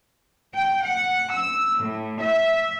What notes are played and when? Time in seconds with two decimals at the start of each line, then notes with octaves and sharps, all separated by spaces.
0.54 G5
0.83 F#5
1.31 E6
1.79 A2
2.20 E5